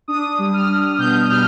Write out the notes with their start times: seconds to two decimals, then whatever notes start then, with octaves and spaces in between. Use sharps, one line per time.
0.08 D4 D#6
0.39 G3
0.53 F6
0.68 D4
0.98 B2 G6
1.29 B2 F6